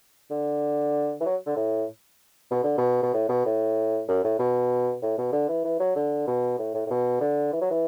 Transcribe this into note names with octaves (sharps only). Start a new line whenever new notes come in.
D3
E3
F#3
D3
A2
B2
D3
B2
B2
A2
B2
A2
F#2
A2
B2
A2
B2
D3
E3
E3
F#3
D3
B2
A2
A2
A2
B2
D3
E3
F#3
E3